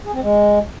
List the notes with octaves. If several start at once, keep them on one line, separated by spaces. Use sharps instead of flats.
G#4
C4
G#3